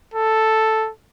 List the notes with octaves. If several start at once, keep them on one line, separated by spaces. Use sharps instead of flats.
A4